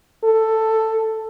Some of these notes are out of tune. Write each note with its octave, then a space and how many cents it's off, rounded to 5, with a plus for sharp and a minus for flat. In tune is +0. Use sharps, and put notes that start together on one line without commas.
A4 +10